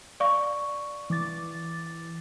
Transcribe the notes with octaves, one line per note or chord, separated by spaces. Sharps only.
D5 F5 C#6
E3 D6 A6